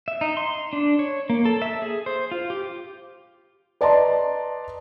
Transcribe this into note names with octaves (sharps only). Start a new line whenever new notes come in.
E5
D#4
C6
D4
C#5
A#3
A4
E5
G#4
C5
F4
G4
B4 D5 D#5 A5 A#5 C6